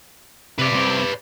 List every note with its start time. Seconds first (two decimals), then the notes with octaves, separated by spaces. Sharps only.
0.58 C3 B4 D5
0.72 C2 C4